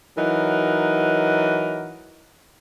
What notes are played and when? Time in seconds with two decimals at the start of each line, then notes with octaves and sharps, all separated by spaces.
0.18 E3 F#3 D#4 A#4 F#5